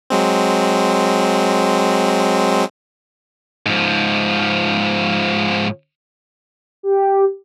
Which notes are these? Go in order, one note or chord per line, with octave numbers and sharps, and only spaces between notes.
F#3 G#3 C4
G#2 F3
G4